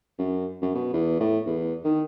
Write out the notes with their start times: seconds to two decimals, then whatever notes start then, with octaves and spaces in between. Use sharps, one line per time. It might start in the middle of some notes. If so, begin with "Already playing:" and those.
0.19 F#2
0.62 F#2
0.75 B2
0.93 E2
1.20 A2
1.46 E2
1.84 D#3